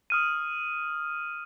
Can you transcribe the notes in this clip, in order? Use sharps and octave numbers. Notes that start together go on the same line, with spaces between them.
D#6 F6 D#7